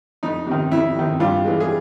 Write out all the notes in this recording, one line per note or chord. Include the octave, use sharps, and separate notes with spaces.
F2 D#4
C3 D#3
F2 E4
C3 D#3
G2 F4
E3 G#3
G#4